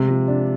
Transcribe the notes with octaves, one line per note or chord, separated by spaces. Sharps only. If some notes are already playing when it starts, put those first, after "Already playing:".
Already playing: C3 G#3
F3
D4